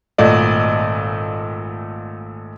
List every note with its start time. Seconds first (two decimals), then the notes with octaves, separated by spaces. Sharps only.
0.18 G#1 A#2 A3 F#4 D5 D#5